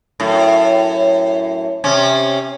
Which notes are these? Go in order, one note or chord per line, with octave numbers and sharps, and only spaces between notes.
F#2 A2
C3 C#4